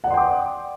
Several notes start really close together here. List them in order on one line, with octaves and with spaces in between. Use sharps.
F#5 D5 C6 G5 D6